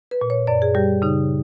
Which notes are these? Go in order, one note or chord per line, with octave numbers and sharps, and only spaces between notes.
B4
A#2
C#5
F#2 D5
G#4
G3 G4
C#3 D#4